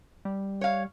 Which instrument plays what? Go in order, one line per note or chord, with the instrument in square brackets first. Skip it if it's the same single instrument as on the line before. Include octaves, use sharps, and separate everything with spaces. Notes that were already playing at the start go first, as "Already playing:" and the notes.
[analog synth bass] G3
[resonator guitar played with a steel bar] C#5 F5